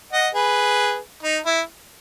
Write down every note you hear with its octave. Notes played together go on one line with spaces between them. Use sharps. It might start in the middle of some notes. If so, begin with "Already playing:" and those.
D#5 F#5
G#4 B4
D#4
E4